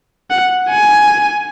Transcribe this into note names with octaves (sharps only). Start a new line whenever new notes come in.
F#5
G#5